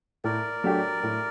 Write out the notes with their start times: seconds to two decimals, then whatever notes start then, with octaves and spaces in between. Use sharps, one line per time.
0.24 A2 A#4 D5
0.64 F#3 A3 D4 G4
1.03 A2